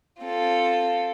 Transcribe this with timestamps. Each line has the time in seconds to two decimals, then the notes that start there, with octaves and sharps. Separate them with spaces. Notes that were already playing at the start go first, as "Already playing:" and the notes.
0.20 C4 F4 A4